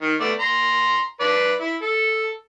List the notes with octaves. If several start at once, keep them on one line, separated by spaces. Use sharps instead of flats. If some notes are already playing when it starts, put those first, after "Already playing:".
D#3
A3 B3 D5
A#5 C6
B4 D5
E4
A4